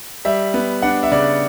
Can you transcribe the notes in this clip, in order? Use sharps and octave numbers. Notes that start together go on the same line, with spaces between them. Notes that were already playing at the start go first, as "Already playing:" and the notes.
G3 E5
B3
D4 F#5
E5
C#3 D5